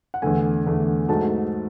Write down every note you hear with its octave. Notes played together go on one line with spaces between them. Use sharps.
F#5
E2 D3 A3 G#5
E2 D3 A3
G#2 F#3 A3 A5